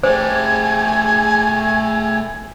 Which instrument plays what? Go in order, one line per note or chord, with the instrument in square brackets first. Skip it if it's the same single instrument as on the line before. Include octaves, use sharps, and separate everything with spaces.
[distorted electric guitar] A3 G4 [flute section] G#4 G#6 [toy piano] C5 [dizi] G#5